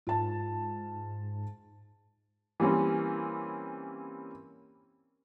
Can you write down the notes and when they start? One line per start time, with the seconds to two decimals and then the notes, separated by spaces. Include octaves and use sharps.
0.07 G#2 F4 A5
2.60 E3 G3 A#3 C4 C#4